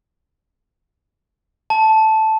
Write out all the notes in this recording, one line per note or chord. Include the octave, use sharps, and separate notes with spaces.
A5